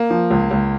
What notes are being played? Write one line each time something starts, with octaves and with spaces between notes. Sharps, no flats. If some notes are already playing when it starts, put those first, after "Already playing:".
Already playing: A#3
F3
C#2
C#2